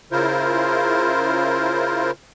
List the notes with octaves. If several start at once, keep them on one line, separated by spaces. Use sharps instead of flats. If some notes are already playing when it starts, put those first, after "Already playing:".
C#3 E4 F4 A#4 C5